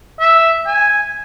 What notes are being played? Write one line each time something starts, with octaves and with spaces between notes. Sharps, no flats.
E5
G#5